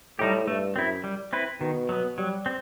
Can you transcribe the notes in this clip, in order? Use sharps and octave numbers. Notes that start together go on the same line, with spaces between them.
A2 G3 D#4 G4
G2 A3
F#2 C4 E4
G3
C4 E4 B4
B2 D#3
F#3 B3
F#3 G3
C4